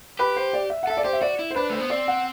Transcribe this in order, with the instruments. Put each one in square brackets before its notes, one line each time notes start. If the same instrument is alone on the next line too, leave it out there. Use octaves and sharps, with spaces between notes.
[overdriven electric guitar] G4 [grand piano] B4
[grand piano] C5
D5
E5
F#5
[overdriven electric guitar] A4 [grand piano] E5
[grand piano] D5
[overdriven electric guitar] G4 [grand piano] C5
[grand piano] E5
[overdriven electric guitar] F#4 [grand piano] D5
[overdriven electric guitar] E4
[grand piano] C5
[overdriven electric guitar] D4 [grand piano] B4
[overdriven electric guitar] A3 [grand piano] C5
[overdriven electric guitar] B3
[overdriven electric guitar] C4 [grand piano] D5
[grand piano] F#5